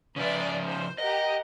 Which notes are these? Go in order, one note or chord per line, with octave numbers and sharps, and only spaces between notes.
C#3 F3 B4 D5 E5
C5
G4 A#4 D#5 F#5